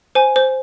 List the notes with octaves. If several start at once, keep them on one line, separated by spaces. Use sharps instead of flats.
C5 G#5
C5